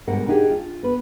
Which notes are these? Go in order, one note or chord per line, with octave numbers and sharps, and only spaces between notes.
D2 G#2 B2 G3 A#4 F#5
D4 D#4 G4 G#4
F4
B3 B4